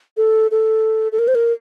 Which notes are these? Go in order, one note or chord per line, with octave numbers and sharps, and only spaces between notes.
A4
A4
A4
A#4
C5
A#4